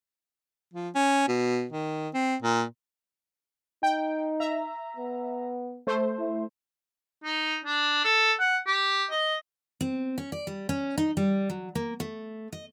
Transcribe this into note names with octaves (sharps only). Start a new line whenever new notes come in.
F3
C#4
B2
D#3
C4
A#2
D#4 G5
E5 A#5
B3
A3 C5
E4
D#4
D4
A4
F#5
G4
D#5
C4
C#4
D5
G3
C#4
D#4
G3
F#3
A#3
A3
D#5